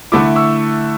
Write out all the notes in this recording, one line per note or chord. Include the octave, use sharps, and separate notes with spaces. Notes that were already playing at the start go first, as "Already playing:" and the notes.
D3 A3 E4 B5 D6
C#6 E6